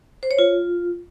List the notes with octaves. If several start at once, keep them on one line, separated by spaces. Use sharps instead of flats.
C5
C#5
F4